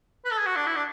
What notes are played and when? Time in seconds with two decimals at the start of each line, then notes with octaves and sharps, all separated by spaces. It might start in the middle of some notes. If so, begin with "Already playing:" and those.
0.25 B4
0.31 A4
0.38 G#4
0.46 F#4
0.56 D4
0.66 E4
0.76 D4